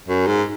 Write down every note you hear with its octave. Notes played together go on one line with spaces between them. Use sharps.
F#2
G#2